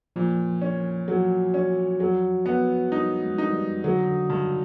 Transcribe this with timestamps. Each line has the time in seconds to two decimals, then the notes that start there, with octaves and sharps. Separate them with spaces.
0.16 A#2 F3
0.62 C#4
1.08 F#3
1.54 C#4
2.00 F#3
2.46 B3
2.92 G3 D#4
3.22 G#3
3.38 D#4
3.53 G3
3.84 D3 F#3
4.07 D3
4.30 G2 C#3